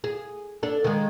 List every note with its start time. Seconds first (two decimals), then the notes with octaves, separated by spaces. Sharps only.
0.04 G#4
0.63 D4 A4
0.84 D#3 G#3